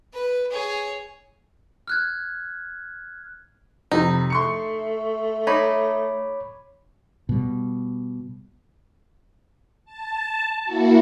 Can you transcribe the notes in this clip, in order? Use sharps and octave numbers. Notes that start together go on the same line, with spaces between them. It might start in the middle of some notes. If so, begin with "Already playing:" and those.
B4
G#4 C#5
F6 F#6 G#6
F2 C3 D#4
A3 C6 C#6 C#7
D#4 C#5 B5 D6
B2 G3
A5
A#3 E4 F#4